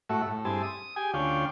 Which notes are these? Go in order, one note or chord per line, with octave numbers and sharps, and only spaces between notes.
A2 A3 F#4 E5
A2
G2 C4 E4 G#4 A5
D#6
G4 G#4 G#5
D2 C#4 F4 D5 G5